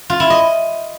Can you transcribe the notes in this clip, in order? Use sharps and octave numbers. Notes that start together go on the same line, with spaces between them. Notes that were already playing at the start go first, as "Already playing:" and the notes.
F4
E4
D#5